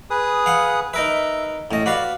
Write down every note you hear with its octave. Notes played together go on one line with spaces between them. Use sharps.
G#4 B4 D#6
F5 F#5
D#4 A#4 B4 E5
A2 C#4 D#5
F#4 B4 D5 F5